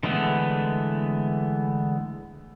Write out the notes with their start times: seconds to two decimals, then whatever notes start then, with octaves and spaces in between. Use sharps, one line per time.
0.03 D3 E3 G#3 A3 B3